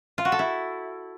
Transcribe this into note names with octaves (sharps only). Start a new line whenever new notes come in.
F4
F#4
A4
E4